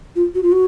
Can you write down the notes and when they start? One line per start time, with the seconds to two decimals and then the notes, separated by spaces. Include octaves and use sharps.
0.16 F4
0.35 F#4
0.43 F4
0.52 F#4